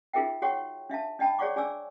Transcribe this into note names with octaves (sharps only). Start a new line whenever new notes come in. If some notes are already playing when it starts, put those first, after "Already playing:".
D#4 F4 G#4 A#4 E5 G5
F#4 G#4 C#5 F#5 G5 C#6
D4 E5 F5 A5
D4 D#5 G5 A5 B5
G#4 C#5 D5 F#5 C#6 D6
D4 G#4 D5 G#5 D6 E6